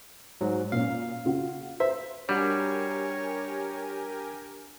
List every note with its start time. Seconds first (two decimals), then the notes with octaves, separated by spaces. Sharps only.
0.41 G#2 F#3
0.72 A#2 C#4 F5
1.25 C#3 F4 F#4
1.80 C5 E5
2.29 G3 D4 F#4 G4 A#4 C#5 G#5